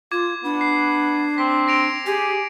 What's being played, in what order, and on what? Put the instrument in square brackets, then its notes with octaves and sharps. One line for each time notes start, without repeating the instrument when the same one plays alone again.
[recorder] F4 [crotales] D6 G#6
[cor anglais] B3 [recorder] D4
[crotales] C7
[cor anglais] C4 [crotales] B6
[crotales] A#6 D7 F7
[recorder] G4 [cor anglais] G#4